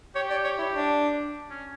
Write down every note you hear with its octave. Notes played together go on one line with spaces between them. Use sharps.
G4 C#5
D5
C#5
E4
D4
C#4